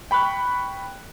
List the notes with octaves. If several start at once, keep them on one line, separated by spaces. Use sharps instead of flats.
G5 B5 C#6 F#6